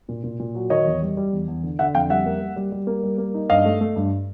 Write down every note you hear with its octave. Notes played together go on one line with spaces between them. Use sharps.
A#2
A#2
A#2
F#3
D#3 C#5 D#5
E2
G3
G3
E2
E2
D3
D3 E5 F#5
F2 F5 G5
G3 E5 F#5
A#3
A#3
G3
G3
A#3
G3
A#3
D#4
G2 D#5 F5
A3
A3
G2